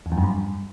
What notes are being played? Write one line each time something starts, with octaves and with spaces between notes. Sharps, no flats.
E2
F2
F#2
G2